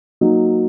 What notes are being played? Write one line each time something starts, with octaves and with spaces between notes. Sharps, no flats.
F#3 A#3 D#4